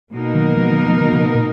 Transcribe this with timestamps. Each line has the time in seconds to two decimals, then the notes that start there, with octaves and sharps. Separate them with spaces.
0.12 B2 A#3 D#4 A#4
0.35 D#3 F#3
0.57 F3 G#3
0.71 D#3 F#3
0.86 F3 G#3
0.97 G#3
1.01 D#3 F#3
1.12 C#3 F3
1.34 A#2